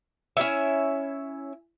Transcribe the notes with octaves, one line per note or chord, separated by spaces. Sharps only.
C#4 E4 C#5 E5